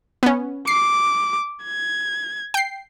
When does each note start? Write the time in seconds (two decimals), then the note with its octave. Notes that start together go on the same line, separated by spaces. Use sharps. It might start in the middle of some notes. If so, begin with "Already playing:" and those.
0.23 B3 C#4
0.67 D6 C7
1.64 G#6
2.54 G5 C7